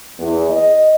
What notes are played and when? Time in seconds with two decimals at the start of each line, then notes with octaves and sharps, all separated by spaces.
0.19 E2
0.50 D#5